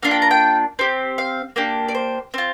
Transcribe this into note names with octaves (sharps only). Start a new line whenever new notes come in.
A#3 D4 F4 F5
G5
A#5
G5
C4 G4
F5
A#3 D4 G4
D5
C5
C4 F4